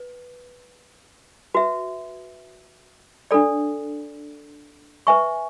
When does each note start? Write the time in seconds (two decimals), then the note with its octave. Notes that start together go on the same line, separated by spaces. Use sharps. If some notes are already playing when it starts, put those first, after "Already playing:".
Already playing: B4
1.54 F#4 B4 E5
3.31 D4 A4 D5
5.07 B4 E5 G#5 C#6